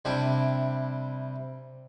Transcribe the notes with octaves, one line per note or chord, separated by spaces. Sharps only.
C3 G3 D4 E4